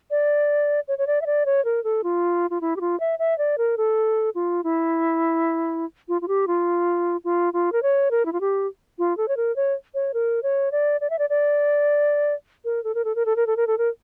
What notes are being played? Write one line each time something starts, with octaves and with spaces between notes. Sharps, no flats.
D5
C#5
C#5
D5
E5
D5
C#5
A#4
A4
F4
F4
E4
G4
F4
E5
E5
D5
A#4
A4
F4
E4
F4
F4
G4
F4
F4
F4
A#4
C#5
A#4
E4
F4
G4
F4
A4
C#5
A#4
C#5
C#5
A#4
C#5
D5
D5
E5
D5
D5
A#4
A4
A#4
A4
A#4
A4
A#4
A4
A#4
A4
A#4